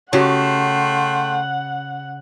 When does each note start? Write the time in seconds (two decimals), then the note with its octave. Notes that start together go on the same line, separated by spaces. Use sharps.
0.13 C#3 A3 F#4 G4 C#5 F#5 G5 C6